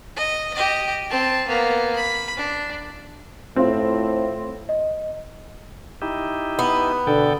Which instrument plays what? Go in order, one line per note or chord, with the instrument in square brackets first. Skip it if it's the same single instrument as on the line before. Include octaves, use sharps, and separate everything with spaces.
[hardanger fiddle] D#5
G4 D#5
C4 A5
A#3 B3
B5
D4
[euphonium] A2 [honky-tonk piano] C4 F4
[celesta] D#5
[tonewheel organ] D#4 E4 G4
[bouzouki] B3
[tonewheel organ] B2 A4 G5 [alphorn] D3